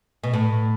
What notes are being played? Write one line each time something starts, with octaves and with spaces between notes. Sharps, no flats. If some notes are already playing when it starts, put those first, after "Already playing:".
B2
A2